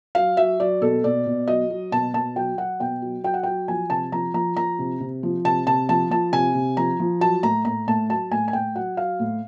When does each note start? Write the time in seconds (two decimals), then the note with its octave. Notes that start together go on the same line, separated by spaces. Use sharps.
0.15 F#3 F5
0.37 F#3 E5
0.60 F#3 D5
0.81 B2 A4
1.04 B2 D5
1.26 B2
1.48 F#3 D#5
1.70 F#3
1.92 B2 A5
2.14 B2 A5
2.36 F#3 G5
2.57 F#3 F#5
2.80 B2 G5
3.02 F#3
3.24 F#3 G5
3.34 F#5
3.43 F#3 G5
3.68 F3 G#5
3.90 C3 A5
4.12 F3 A#5
4.34 F3 A#5
4.57 F3 A#5
4.79 C3
5.00 C3
5.23 F3
5.45 C3 A5
5.67 C3 A5
5.89 F3 A5
6.10 F3 A5
6.32 C3 G#5
6.55 C3
6.77 F3 A#5
7.00 F3
7.20 F#3 A5
7.43 A2 A#5
7.65 A2 A#5
7.87 A2 A5
8.09 F#3 A5
8.31 A2 G#5
8.48 G#5
8.53 A2 G5
8.75 F#3 F#5
8.97 F#3 F5
9.20 A2